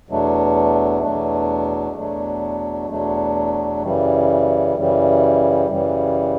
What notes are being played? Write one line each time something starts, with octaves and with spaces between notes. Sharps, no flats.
E2 B2 F#3 A3 D4
E2 B2 F#3 A3 D4
E2 B2 F#3 A3 D4
E2 B2 F#3 A3 D4
F#2 C#3 E3 G3
F#2 C#3 E3 G3
F#2 C#3 E3 G3